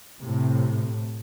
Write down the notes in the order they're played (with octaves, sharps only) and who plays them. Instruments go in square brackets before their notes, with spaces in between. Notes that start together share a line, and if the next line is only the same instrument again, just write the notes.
[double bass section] A2 C3